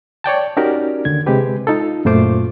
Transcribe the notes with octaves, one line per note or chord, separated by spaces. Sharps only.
C#5 D5 G5 A5
C#4 D#4 F#4 G4 A#4 D5
D#2 D3 G#6
C3 G#3 C4 G4 B4
D#4 F4 A4
F#2 A#2 A3 F4 C5 D6